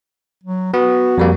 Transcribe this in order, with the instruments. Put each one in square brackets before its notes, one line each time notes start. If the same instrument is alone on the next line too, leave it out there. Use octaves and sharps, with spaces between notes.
[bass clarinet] F#3
[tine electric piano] B3 [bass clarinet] F#4
[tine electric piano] F2 G3 A#3